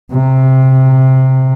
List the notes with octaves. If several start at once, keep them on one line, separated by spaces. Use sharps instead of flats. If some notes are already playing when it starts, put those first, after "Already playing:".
C3